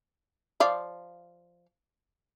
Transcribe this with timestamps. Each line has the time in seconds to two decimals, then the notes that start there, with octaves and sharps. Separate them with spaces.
0.60 F3 D5 F5